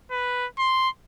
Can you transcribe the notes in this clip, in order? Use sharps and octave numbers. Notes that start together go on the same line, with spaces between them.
B4
C6